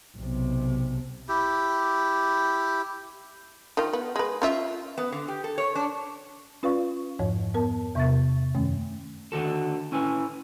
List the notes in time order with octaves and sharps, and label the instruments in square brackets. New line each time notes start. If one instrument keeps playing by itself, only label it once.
[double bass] B1 C3
[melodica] E4 G4
[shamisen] D#3 F4
B3
G#3 B4
C#4 F4 E5
[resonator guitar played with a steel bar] B3
D3
G4
A4
C#5
D4
[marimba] C#4 F4 B4 D5 F5 C#6
F2 G#2 F3 C#5
B3 A#4 A5
E2 C3 B3 E5 C#6 A6
F#2 D#3 A3 C#4
[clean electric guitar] D3 D#3 F#4 A4
C#4 E4 B4 G#5